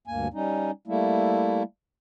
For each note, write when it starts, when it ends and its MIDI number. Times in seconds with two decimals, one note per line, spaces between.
0.07 0.28 38
0.07 0.28 43
0.07 0.28 58
0.07 0.28 80
0.34 0.71 55
0.34 0.71 61
0.34 0.71 63
0.87 1.63 55
0.87 1.63 57
0.87 1.63 58
0.87 1.63 64